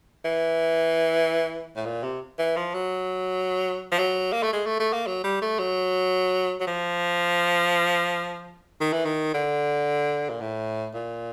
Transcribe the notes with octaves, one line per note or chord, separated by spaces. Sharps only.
E3
A2
A#2
C3
E3
F3
F#3
F3
F#3
A#3
A3
G#3
A3
A3
A#3
F#3
G3
A3
F#3
F#3
F3
D#3
E3
D#3
D3
A#2
A2
A#2